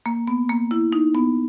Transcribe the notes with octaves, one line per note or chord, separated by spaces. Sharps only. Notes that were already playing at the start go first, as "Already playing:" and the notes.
A#3
B3
A#3
E4
D#4
B3